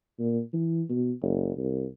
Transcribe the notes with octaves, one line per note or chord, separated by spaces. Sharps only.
A#2
E3
B2
F#1
C2